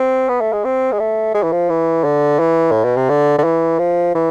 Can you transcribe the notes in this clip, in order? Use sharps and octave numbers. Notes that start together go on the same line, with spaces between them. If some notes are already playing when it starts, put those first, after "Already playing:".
Already playing: C4
B3
A3
G#3
C4
G#3
A3
G#3
E3
F3
E3
D3
E3
A2
B2
C3
D3
D3
E3
F3
E3